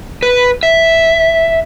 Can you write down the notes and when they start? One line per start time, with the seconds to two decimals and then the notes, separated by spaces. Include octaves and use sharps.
0.23 B4
0.63 E5